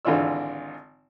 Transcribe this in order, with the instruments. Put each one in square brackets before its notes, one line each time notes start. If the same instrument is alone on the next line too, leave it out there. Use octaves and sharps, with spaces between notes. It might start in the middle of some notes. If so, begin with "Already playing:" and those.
[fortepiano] G#1 D3 E3 F4 D5 E6